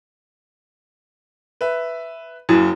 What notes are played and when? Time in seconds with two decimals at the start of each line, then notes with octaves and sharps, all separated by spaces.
1.61 B4 E5
2.49 F#1 F#2 E4 F#4 D#6